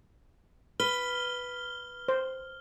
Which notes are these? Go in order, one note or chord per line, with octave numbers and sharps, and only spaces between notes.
B4 F6 G7
C5